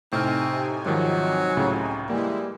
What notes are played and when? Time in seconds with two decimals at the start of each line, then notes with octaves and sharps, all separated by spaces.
0.12 A2 C3 C4 D#4 G#5 F6
0.86 G#2 D#3 F3 F#3
1.57 C#2 A2 C#3
2.09 E3 G3 G#3 A#3 E4